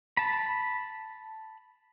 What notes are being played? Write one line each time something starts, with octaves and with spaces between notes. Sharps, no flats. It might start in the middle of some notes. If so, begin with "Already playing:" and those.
A5 B5